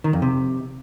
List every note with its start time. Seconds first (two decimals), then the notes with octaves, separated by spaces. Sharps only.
0.04 D#3
0.13 F2
0.22 C3